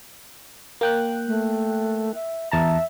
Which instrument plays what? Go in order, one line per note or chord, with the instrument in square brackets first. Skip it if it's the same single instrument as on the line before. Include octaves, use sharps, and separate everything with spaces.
[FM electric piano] A#3 G5 F#6
[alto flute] A3
E5
[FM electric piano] E2 A5 A#5 [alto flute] E5